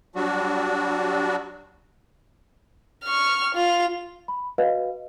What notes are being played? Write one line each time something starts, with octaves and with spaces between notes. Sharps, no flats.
F#3 G3 D4 F#4
C#6 F6
F4 F7
B5
F#4 B4 D#5 F5